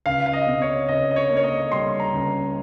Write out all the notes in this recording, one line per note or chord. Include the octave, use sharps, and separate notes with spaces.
C#2 F5
F5
D#5
C3
C#5
C#2 D#5
D#5
C#5
A#3
C#5
D#5
G3 C6
A#5
C#2